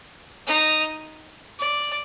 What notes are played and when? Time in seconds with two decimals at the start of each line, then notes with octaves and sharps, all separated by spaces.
0.47 D#4
1.59 D5